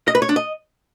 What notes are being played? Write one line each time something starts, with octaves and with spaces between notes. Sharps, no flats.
D#5
B4
C#5
D4
D#5